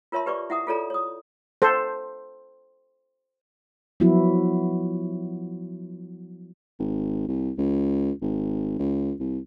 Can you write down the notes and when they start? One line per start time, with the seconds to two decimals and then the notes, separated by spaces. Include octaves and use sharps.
0.12 F4 A#4 C#5 E5 A5 C6
0.26 G4 B4 D5 C#6 D6
0.50 E4 E5 F#5 A#5 D#6
0.67 F4 G#4 A4 C#5 D5 A#5
0.90 C#5 D#6
1.62 A4 C5
4.00 F3 F#3 B3 E4 F#4
6.79 G#1
7.28 C2
7.58 C#2
8.22 G#1
8.79 C#2
9.20 C2